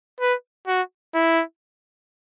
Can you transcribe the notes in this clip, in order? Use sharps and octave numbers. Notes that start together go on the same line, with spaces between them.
B4
F#4
E4